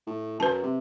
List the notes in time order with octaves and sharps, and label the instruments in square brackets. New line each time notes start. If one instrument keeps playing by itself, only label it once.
[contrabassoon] A2
[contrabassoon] F#2 [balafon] B4 A5
[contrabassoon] C3